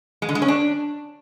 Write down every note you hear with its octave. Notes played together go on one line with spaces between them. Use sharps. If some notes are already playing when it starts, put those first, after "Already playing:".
G#3
D3
G#3
C#4
D4